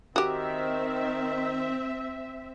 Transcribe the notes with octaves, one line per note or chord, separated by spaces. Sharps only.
D#3 C4 F#4 G4 E5